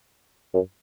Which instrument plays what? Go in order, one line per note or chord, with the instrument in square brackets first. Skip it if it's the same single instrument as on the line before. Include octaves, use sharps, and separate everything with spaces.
[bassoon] F#2